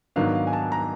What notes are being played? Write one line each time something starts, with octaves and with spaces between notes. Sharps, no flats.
G#2 D#3 F#3 B3 D4 F5
F5
G#5
A5
A#5